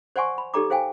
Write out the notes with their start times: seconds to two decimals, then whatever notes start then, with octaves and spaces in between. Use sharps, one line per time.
0.16 C5 D5 F#5 G#5 C6 C#6
0.38 B5
0.54 D#4 G4 A4 D5 A#5 D6
0.70 G#4 C5 F5 G5 G#5